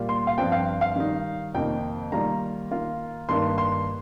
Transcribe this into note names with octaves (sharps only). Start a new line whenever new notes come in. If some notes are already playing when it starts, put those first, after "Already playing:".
Already playing: A#2 G3 A#3 F4
C6
F5
G2 F3 C4 G5
F5
F5
D#3 G3 D#4
F2 C3 D#3 A#3 G5
D#3 G3 A#3 F4 A#5
D#3 A#3 F4
G2 D#3 A#3 C6
C6